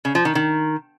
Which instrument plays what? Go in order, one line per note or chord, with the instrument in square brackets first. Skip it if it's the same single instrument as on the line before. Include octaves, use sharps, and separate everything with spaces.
[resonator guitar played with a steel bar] C#3
F3
D#3
D#3